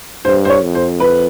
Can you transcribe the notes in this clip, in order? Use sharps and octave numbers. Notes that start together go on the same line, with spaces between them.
G2 C5
C5
C#5
F2
C5
B4